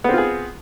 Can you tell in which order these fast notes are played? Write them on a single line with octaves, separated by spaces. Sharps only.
B3 C4 F4 G#4